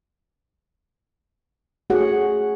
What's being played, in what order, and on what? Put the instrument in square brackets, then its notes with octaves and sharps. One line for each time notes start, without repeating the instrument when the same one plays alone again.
[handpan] A3 F#4 G#4 C#5 F#5